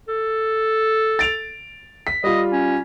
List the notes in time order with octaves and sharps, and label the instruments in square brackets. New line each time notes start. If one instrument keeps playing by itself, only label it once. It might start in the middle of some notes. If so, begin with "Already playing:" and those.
[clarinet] A4
[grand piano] A6 D7 F7
B6
[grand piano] G3 F4 [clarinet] D#5
[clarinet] C#4